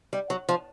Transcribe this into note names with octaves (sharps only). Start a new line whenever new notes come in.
G3
F#3
F3